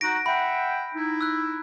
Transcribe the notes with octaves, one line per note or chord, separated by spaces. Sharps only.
D#4 F#4 A#6 D7
E5 F#5 G5 B5
D#4 E4
E6 F#6